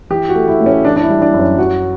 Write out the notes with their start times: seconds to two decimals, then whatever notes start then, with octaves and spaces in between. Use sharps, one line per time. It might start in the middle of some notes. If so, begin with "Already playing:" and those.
0.10 E3 G4
0.29 F#4
0.35 A3
0.48 E4
0.60 A2
0.66 C#4
0.84 E3 D4
0.96 D4
1.02 E4
1.10 G3
1.22 D4
1.34 F#2
1.39 C#4
1.58 F#3 F#4